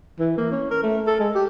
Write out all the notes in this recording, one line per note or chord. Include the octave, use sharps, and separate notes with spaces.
E3
A#3
C#4
A#4
A3
A4
G#3
G4